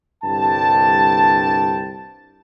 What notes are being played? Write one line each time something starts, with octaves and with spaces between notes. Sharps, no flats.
C2 G2 D3 G5 A5